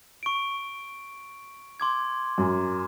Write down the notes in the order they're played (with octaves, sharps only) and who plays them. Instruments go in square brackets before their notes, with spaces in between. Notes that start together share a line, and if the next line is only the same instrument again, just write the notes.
[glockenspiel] C#6 D7
C6 D6 G#6
[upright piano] F#2